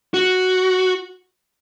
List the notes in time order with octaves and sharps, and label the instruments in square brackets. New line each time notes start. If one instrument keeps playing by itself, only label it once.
[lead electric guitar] F#4